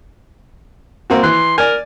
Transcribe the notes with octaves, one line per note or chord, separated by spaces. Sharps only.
A#3 C4 F#4
E3 C6 F#6
A#4 D5 G#5